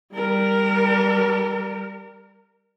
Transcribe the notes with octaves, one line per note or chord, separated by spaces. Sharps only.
G3 A#4